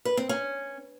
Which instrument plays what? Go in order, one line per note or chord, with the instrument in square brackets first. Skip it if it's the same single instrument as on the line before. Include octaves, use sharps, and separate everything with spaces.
[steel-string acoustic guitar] B4
C4
C#4